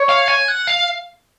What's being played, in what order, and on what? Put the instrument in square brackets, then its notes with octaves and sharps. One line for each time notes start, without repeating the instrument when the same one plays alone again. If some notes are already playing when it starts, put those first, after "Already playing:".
Already playing: [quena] C#5
[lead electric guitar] F5
G#5
F#5
F5